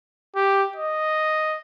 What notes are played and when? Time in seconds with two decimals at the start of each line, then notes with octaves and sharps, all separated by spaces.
0.35 G4
0.76 D#5